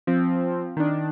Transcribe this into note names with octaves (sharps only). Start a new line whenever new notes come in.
F3 C4
D#3 D4